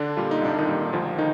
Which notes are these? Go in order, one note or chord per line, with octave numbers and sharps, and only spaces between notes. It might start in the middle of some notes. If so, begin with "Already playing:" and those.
Already playing: D3 D4
A#2 G3 F4
D#4
C2 D4
D#3 D#4
A#2 G3
D2 F3 F4
D3 D#3 D#4